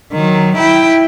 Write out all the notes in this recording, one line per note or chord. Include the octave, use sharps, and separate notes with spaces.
D#3 F#3
E4 G5